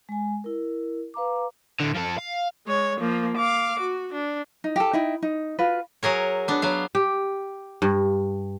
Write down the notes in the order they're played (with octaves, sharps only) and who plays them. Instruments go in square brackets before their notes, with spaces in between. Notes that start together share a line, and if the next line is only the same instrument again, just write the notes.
[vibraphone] G#3 G#5
E4 A#4
B4 F5 A#5 D6
[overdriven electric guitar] A2 D3
F3 A4
F5
[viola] G#3 C#5
F3 A#3
F5 D6
F#4
D4
[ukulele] D#4
G4 A4
D#4 E4 G5
D#4
F4 F#4 B4
[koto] F#3 G#4 A#4 C#5
B3 D4
F#3 B3 F5
[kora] G4
G2